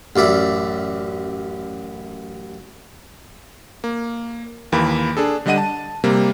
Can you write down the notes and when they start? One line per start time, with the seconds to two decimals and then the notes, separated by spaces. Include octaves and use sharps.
0.16 A1 F#2 D5 E5
3.84 A#3
4.72 D#2 E3 A#3 B5
5.17 D4 G#4 A4
5.46 D3 G3 D4 D#5 F#5 D#7
5.58 A5
6.04 C3 G3 A#3